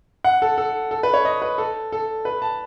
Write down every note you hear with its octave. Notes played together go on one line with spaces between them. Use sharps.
F#5
A4
A4
A4
B4
C#5
D#5
B4
A4
A4
B4
A5